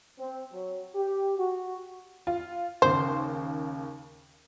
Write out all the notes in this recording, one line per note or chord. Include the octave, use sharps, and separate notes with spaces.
C4
F#3
G4
F#4
F4
D#2 C#3 C5